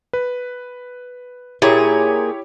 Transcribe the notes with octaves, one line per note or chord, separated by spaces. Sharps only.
B4
A#2 E4 G4 G#4 C#5